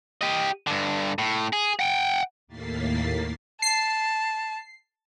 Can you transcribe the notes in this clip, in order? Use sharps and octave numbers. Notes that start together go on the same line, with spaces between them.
G4 D#5
G2 D3
A2
G#4
F#5 G5
D#2 A2 A#3 A6 B6 C7
A5 C7